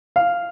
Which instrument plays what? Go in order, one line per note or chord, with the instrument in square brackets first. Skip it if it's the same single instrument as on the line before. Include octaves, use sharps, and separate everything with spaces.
[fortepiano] F5